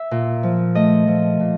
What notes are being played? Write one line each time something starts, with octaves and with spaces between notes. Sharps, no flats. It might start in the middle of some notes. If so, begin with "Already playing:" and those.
Already playing: E5
A#2
F3
A3 D#5
F3
A#2